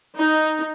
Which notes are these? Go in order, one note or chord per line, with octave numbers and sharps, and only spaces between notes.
D#4